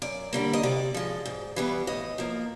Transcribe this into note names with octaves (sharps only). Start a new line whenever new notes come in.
F#2 D5
D3 G3 A#3
D#5
C3 D5
F3 G#3
G#2
E3 G3 B3
A2 D#5
F3 A#3